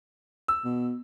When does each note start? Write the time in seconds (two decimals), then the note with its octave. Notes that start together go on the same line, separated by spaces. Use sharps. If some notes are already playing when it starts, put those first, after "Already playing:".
0.48 E6
0.65 B2